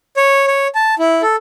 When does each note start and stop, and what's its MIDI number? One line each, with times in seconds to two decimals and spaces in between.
0.17 0.46 73
0.47 0.67 73
0.75 0.95 81
0.99 1.22 64
1.22 1.36 69